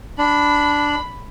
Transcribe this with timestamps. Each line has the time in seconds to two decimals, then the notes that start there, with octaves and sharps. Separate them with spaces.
0.18 D4 B5